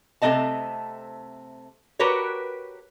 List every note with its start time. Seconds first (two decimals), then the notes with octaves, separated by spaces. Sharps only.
0.22 C3 A3 C4 D#4 D#5 A5
1.99 F#4 G4 A#4 B4 C#5